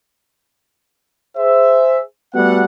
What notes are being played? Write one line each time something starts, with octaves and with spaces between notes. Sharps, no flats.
G#4 C5 E5
G3 A3 B3 F#4 A4 F#5